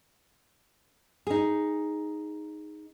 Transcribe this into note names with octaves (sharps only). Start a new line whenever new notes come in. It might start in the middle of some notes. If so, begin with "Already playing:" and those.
D#4 G#4